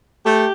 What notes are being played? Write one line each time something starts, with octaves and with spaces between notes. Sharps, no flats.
A3 G4